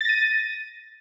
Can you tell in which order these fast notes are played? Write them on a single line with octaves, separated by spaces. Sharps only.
A6 A#6 D#7